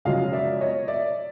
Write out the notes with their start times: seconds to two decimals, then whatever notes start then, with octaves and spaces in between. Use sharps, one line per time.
0.05 F#2 C#3 F3 G#3 D#5 F5
0.33 D5 E5
0.61 C#5 D#5
0.88 D5 E5